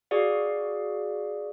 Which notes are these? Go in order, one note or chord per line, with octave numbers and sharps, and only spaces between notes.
F#4 G#4 D5 F5